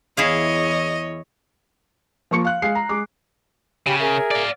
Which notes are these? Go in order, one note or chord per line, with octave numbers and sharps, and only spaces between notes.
E2 E4 G#4 C#5 D#5 F5
F3 A#3 C#6 C#7
F5 F#6
G#3 F5 C7
A#5
G#3 D6
C#3 G4 B5
G#4 A#4 E5
D5 F5